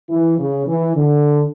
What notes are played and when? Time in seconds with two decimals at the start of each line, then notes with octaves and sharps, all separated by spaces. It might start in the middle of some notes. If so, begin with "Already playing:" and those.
0.10 E3
0.39 C#3
0.67 E3
0.97 D3